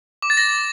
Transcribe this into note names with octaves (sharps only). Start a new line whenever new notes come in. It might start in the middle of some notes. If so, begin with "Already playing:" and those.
D6
A6
A#6